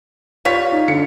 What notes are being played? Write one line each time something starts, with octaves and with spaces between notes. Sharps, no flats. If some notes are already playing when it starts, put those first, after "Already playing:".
G3 F4 C#5 B6
D#4
D3 C#7